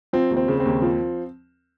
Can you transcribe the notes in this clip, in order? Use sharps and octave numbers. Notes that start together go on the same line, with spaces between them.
F3 C4
D#2
C4
C#3
C4
D#2
F3